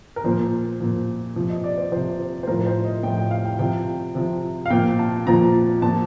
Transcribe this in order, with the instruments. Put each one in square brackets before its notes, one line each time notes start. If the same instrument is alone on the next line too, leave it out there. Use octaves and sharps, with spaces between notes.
[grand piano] A#4
A#2 F3 C5
A#2 F3
C3 F3
D#5
D5
C5
C3 F3 C5
C5
C5
A2 F3 A#4
C5
D#5
A2 F3 G5
G5
F5
G5
C3 F3 G5
C3 F3
F5
A#2 F3 G5
A5
A#2 F3 A#5
A#2 F3 A5